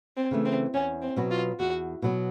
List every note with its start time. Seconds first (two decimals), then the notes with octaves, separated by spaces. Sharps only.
0.17 C4
0.31 C#3 E3 A3
0.45 C4
0.74 E2 C#4
1.02 C4
1.17 B2 F#3 B3
1.31 F4
1.59 E2 F#4
2.02 B2 F#3 B3